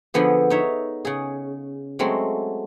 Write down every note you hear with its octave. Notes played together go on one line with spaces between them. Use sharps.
D3 F3 B3 G#4
D#4 C#5 E5
C#3 G#4
F#3 G#3 A3 C4 F#4